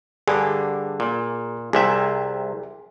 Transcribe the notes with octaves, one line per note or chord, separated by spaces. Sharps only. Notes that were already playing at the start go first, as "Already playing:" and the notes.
G2 D3 G#4
A#2
C2 C3 G#4 E5